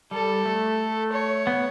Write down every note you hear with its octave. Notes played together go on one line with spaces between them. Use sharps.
G3 A4
A3
C#5
B3